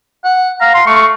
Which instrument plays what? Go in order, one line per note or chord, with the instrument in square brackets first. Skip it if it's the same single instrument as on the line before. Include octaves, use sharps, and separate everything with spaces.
[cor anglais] F#5
[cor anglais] F5 [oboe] A#5
[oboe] C6
[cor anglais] A3 [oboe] C#6